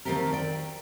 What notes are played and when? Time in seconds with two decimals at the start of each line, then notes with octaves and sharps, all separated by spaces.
0.05 D#3 F3 A3 C4 G4 A#4
0.32 D5 G5